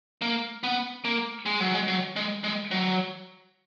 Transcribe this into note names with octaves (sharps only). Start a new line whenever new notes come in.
A#3
B3
A#3
G#3
F#3
G#3
F#3
G#3
G#3
F#3